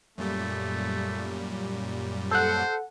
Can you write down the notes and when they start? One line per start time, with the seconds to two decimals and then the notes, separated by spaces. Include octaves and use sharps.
0.18 F#2 A#2 G3 A3
2.31 A4 C5 F#5